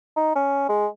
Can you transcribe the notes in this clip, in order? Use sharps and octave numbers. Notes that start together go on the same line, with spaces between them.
D#4
C#4
G#3